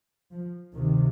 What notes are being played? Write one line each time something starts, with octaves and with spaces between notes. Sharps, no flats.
F3
D2 C3 D#3